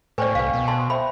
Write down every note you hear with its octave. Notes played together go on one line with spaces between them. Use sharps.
A2 B4 C5 D5 G5 G#5 C#6
C2 B4 F5
B2
A5 C6
C5 E5 G5 B5